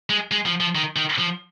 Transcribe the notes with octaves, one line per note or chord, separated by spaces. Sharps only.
G#3
G#3
F3
F3
D#3
D#3
F3